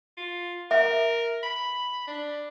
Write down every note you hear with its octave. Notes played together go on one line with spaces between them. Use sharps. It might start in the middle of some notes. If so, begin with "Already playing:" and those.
F4
A#4 E5 A#5
B5
D4